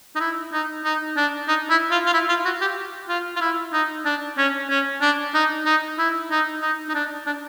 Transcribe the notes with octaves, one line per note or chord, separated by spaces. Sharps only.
D#4
E4
D#4
D#4
D4
D#4
E4
F4
F4
E4
F4
F#4
G4
F4
F4
E4
D#4
D4
C#4
C#4
D4
D#4
D#4
E4
D#4
D#4
D#4
D4
D4